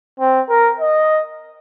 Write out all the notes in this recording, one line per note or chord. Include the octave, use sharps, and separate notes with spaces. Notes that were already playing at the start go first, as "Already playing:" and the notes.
C4
A#4
D#5